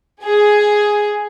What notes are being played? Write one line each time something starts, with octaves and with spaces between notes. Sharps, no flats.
G#4